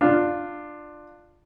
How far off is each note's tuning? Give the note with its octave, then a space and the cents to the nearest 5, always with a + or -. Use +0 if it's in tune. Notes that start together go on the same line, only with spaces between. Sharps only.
D4 +20 F4 +0